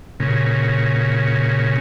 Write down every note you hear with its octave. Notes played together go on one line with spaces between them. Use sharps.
A#2 C#3